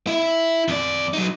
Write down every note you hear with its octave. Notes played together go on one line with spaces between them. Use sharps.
E4 E5
F2 D5
F#3 D#4